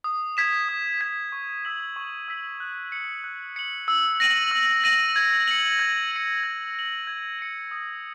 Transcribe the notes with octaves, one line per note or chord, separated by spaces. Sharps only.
D#6
G#6 B6 E7
D#6
G#6 B6 E7
C#6
E6 B6 F#7
C#6
E6 B6 F#7
F#6
C#7 F#7
F#6
C#7 F#7
E6
A#6 D#7 F#7
E6
A#6 D#7 F#7
G#6
C#7 F#7
G#6
C#7 F#7
G#6
C#7 F#7
G#6
C#7 F#7
D#6